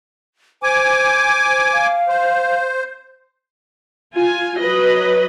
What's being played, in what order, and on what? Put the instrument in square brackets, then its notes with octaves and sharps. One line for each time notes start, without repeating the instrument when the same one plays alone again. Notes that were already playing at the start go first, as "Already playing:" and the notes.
[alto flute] C5 [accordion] G#5 D6
[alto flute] F5
[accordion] C5
[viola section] F4 G#5
F#3 B4 D#5